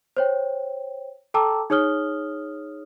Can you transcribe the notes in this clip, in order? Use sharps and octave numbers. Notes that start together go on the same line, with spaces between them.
C5 C#5 G5
A4 G5 A5 A#5 D6 E6
D#4 G#4 C#5 D#6 F6 G7